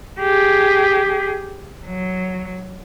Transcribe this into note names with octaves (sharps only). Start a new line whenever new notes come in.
G4 G#4
F#3